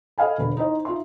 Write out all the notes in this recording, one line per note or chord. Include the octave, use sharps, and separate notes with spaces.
A4 D#5 F5 G#5 B5
E1 D3 B4 B5
D#4 E4 C5 D#5
D#4 F4 E5 C6